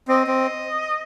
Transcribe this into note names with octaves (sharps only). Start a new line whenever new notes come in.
C4 D#5
C4